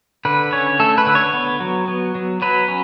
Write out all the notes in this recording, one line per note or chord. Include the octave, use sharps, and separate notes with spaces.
D3 B4
C#4 C#5
A3 A4
B4
D3
C#5
B3
F#3
B3
F#3
F#3 B4
C#4